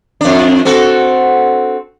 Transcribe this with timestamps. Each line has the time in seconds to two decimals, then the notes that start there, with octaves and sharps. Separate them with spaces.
0.21 F2 D4
0.65 C4 F#4 A4